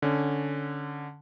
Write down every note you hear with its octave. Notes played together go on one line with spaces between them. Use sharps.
D3 C#4